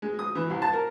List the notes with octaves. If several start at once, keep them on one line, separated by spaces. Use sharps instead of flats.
G#3
D#6
E3
C2
A5
A#4